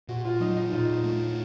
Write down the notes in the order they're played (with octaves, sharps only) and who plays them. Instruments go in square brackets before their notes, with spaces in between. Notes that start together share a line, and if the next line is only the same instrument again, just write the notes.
[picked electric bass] A#2 [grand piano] F#4
[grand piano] F4
[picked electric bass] F#3 [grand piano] D#4
[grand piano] D#4
[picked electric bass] A#2 [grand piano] F4
[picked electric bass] A3